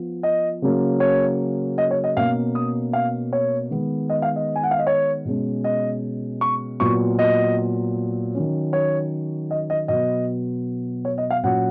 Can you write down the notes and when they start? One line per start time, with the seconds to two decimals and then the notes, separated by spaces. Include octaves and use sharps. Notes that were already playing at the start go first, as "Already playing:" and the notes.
Already playing: F3 B3
0.23 D#5
0.62 C#3 F#3 A#3 C#4
1.00 C#5
1.78 D#5
1.91 C#5
2.04 D#5
2.17 B2 A#3 C#4 F5
2.55 D#6
2.93 F5
3.33 C#5
3.71 D#3 G#3 B3
4.10 D#5
4.22 F5
4.36 D#5
4.56 G#5
4.63 F#5
4.71 F5
4.79 D#5
4.87 C#5
5.25 B2 G#3 C#4
5.64 D#5
6.41 C#6
6.80 A#2 F#3 B3 C#6
7.19 D#5
8.35 D#3 F#3 C#4
8.73 C#5
9.51 D#5
9.70 D#5
9.88 B2 F#3 B3 D#5
11.05 C#5
11.18 D#5
11.30 F5
11.43 A#2 F#3 C#4 F#5